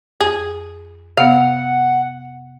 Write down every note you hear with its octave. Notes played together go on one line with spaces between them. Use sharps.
F2 G#4
C3 B3 F5 F#5